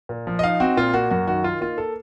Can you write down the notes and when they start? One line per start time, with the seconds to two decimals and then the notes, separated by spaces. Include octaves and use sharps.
0.09 A#2
0.27 F3
0.39 D#5
0.43 D#4 F5
0.60 C4 F#4
0.77 A#2 F4
0.93 A#3 F#4
1.11 F#2 F#4
1.28 D#3 F#4
1.44 D#4 F4
1.61 A#3 F4
1.78 A4